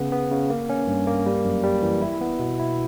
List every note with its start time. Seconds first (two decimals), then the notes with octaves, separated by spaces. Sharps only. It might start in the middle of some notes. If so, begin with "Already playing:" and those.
Already playing: C#3 B3
0.12 B3
0.31 C#3
0.50 A#3
0.69 C#4
0.87 G2
1.07 A#3
1.26 G3
1.45 F#2
1.63 G3
1.82 E3
2.02 E4
2.21 B3
2.39 B2
2.59 E4